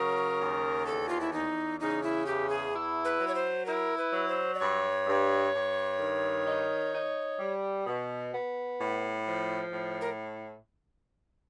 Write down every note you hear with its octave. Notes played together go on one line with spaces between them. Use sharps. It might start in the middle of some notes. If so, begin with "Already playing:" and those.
Already playing: C#3 F#3 A#4
D#2
E2 A4
F4
E4
E2 D#4
C#3 D#4
E4
E2 G4
G#4
E4
B4
F#3
C#5
C5
E4 A#4
B4
F#3
C5
D5
G2 C#5
G2
G2
D#3
D#4
D#4
G3
B2
B3
A2
F3
A2
A#4